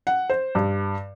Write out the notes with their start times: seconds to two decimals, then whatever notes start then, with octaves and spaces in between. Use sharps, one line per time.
0.07 F#5
0.30 C5
0.55 G2